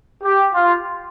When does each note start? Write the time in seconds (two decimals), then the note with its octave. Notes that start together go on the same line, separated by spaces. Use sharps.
0.23 G4
0.53 F4